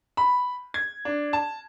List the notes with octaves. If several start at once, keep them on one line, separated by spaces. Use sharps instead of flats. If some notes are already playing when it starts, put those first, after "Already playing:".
B5
G#6
D4
A5